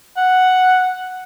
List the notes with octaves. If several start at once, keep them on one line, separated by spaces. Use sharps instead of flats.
F#5